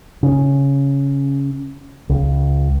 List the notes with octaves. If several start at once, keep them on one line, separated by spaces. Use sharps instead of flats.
C#3
C#2